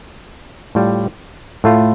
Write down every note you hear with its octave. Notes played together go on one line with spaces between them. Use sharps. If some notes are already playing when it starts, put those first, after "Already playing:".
A2 G3 F4
A2 A3 F4